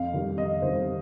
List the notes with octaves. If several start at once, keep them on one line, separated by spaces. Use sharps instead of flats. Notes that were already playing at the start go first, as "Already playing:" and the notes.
Already playing: F2 F5
D#3 G3
F2 D#5
D#3 G3 C5